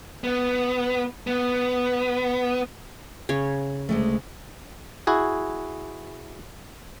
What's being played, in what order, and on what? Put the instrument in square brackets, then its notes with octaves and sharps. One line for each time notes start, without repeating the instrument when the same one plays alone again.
[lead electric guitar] B3
B3
[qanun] C#3 C#5
[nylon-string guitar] D2 G#3 A3
[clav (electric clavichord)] E4 F#4 G#4